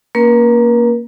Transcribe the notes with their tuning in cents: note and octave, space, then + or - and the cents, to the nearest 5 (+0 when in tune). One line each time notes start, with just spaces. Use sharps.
A#3 +0 C#4 +0 A#4 +45